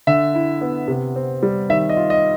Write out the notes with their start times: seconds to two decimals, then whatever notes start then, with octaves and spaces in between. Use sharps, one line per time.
0.07 D3 E5
0.35 E4
0.61 B3
0.88 C3
1.16 C4
1.43 G3
1.70 D#3 E5
1.89 D#5
1.97 F4
2.10 D#5